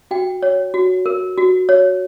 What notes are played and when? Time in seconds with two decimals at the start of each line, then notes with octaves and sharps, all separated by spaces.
0.11 F#4 G5
0.43 C#5
0.74 F#4
1.06 A#4
1.38 F#4
1.69 C#5